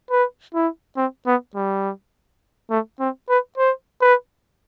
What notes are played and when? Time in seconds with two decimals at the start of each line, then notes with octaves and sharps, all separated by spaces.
0.11 B4
0.54 E4
0.97 C4
1.27 B3
1.55 G3
2.70 A3
3.00 C4
3.29 B4
3.57 C5
4.01 B4